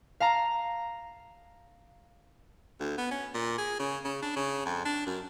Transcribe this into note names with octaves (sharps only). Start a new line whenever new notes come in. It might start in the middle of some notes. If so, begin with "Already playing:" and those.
F5 A5 A#5
D2
B3
C#4
A#2
G#4
C#3
C#3
D4
C#3
F2
D4
F#2